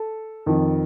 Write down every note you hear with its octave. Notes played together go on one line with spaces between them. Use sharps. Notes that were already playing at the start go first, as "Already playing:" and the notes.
Already playing: A4
F2 D#3